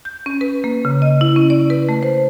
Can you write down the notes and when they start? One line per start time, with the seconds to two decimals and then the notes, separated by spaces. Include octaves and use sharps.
0.05 G6
0.26 C#4
0.41 B4
0.64 A#3
0.85 C#3
1.02 D#5
1.21 E4
1.36 C#4
1.50 D5
1.70 B4
1.89 A3
2.03 C5